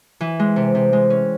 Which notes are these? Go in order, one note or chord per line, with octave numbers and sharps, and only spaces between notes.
E3
G#3
C3
C3
G#3
C#4